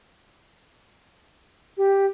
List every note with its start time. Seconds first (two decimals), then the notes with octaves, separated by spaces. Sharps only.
1.78 G4